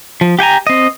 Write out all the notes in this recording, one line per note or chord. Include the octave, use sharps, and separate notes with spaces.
F3
G4 G5 G#5 A#5
C4 D#5